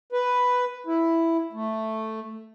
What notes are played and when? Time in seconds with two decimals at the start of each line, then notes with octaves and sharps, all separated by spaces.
0.12 B4
0.87 E4
1.53 A3